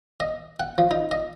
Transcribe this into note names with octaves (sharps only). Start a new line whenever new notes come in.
D#5
F#5
F3
D#4
D#5